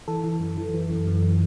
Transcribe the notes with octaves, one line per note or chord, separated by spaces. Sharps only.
E3 A4
E3
F#2
E3
E3
F#2
F#2
E3